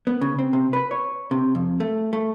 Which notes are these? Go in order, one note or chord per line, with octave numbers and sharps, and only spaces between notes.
B3
C#3
C4
C3
B4
C#5
C3
F2
A3
A3